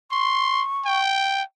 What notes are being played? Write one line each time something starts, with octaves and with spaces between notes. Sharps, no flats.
C6 C#6
G5